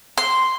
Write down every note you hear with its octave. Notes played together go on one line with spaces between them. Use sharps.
C6